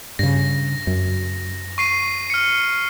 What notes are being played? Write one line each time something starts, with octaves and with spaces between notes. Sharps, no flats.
G2 C#3 A#6
F#2
C#6 C7 D#7
F6 C#7